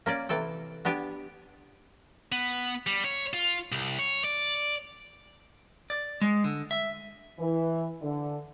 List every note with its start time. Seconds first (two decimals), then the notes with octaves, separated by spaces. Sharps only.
0.06 A#3 C#4 D5
0.29 C3 E3 A4 G5
0.85 B3 D4 G4 G#5
2.32 B3
2.87 G3
3.04 C#5
3.34 F4
3.72 C2
3.99 C#5
4.24 D5
5.90 D5
6.21 G#3
6.44 D3
6.71 E5
7.39 E3
8.02 D3